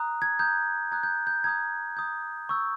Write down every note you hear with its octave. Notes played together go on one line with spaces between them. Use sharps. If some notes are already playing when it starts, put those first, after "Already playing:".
Already playing: A#5 D#6 F#6
G#6
A#5 D#6 F#6 G6
A#5 D#6 F#6 G#6
G6
G6
A#5 D#6 G6 G#6
A#5 D#6 G6
C#6 E6 G6